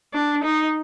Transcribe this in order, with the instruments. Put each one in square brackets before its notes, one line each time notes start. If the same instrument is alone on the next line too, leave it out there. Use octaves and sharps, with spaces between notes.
[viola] D4
D#4